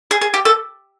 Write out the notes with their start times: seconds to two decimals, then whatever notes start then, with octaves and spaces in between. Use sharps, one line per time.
0.11 G#4
0.21 G#4
0.34 G4
0.45 A4